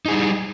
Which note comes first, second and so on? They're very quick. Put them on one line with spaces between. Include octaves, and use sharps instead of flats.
D#4 G#4 G3